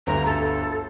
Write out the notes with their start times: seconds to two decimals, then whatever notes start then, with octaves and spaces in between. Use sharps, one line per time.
0.07 G1 D2 A#5
0.26 A4